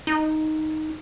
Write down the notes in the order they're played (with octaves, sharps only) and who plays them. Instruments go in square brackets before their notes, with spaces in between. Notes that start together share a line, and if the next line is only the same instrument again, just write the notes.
[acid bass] D#4